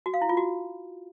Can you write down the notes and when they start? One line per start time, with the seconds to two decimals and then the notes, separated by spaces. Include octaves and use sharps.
0.06 F#4
0.14 F5
0.21 E4
0.29 F4
0.37 F#4